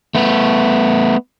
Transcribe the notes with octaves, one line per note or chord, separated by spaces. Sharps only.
A3 B3